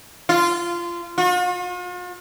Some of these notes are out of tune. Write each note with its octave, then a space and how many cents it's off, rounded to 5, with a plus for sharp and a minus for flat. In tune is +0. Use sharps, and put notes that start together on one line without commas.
F4 -20
F4 +45